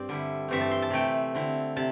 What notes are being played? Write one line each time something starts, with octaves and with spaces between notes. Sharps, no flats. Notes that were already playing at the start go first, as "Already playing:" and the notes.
Already playing: G2 C4 C5 D5
D3 G3 E4
G2 E3 A3 C4 E5
A5
C6
A5
C3 A3 C4 G5
D3 C4 E4
C3 A5